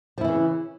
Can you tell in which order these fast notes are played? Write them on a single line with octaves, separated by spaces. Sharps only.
F3 E4 E3 C#3